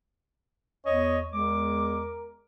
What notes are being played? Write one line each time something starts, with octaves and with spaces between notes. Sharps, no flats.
E2 C#5 D#5
E2 G#3 A#4 D6